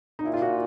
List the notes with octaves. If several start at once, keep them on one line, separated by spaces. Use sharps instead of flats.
D#4
A#2 E4
F4
F#4